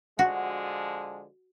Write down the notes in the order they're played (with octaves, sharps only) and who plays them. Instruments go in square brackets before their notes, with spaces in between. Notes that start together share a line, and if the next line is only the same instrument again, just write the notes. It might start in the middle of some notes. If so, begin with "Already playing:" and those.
[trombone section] D3 F3 G#3 [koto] F#4